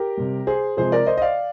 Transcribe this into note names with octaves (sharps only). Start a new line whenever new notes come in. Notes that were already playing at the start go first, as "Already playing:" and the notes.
Already playing: G4 A#4
C3 G3
G#4 C5
C3 F3 G#3 G#4 C5
A#4 D5
C5 D#5
D#5
D5 F5